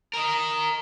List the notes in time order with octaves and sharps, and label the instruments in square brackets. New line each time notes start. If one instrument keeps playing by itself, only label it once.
[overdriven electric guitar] A#4 D#5